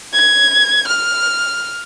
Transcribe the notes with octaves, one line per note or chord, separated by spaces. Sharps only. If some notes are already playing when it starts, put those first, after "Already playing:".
G#6
F6